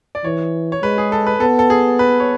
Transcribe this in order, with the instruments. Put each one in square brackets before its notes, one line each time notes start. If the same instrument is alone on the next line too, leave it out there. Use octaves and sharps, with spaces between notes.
[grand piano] D5
[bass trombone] E3 [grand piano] C#5
[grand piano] C#5
[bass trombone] G#3 [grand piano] B4
[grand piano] G#4
A4
B4
[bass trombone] B3 [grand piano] A4
[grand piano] A4
G#4
B4
C#5